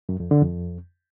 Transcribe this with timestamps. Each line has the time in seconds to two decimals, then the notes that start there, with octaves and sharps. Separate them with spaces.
0.09 F#2
0.20 F2
0.31 D3
0.42 F2